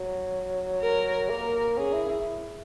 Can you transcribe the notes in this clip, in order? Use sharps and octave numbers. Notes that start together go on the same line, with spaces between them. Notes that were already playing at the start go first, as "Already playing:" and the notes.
Already playing: F#3
A#4
A#3 A#4
C#4 G#4
E4
E4